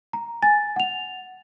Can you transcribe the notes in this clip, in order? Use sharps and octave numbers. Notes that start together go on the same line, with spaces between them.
A#5
G#5 A6
F#5 F7